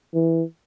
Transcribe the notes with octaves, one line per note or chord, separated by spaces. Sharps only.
E3